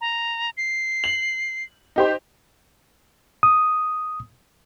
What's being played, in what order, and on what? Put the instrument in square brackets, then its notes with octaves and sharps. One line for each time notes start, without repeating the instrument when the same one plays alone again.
[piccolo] A#5
C7
[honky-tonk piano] F#7
D#4 G4 C5
[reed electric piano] D#6